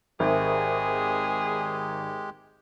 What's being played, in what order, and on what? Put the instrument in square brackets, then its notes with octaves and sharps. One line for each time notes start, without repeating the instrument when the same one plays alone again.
[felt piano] G#1 [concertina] G#3 G4 [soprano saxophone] G#4 [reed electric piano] A#4 C5 E5